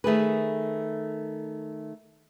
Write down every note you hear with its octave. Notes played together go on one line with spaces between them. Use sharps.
D#3 A3 G#4 B4